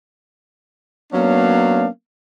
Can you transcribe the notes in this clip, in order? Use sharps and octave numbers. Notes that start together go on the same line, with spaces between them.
F#3 A#3 B3 C#4 D4 F5